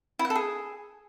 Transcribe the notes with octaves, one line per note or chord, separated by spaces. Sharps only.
E4
F#5
A4
G#4